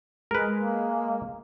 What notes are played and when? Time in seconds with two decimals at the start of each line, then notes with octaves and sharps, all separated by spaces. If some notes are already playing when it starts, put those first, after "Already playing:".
0.31 G#3 A#4 B4
0.57 A#3